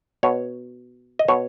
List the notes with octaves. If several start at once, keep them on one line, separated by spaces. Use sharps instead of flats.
B2 C#5
D#5
B2 C#5